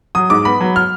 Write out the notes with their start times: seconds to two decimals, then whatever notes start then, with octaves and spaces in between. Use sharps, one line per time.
0.15 F#3 D#6
0.30 G#2 D6
0.45 B3 B5
0.61 F#3
0.76 F6